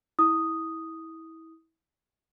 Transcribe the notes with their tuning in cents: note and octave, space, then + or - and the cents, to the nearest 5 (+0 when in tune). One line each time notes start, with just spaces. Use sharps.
E4 -25 D#6 +0